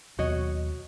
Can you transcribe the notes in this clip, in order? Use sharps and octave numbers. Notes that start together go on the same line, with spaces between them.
D#2 B2 F#3 F#4 C#5 D#5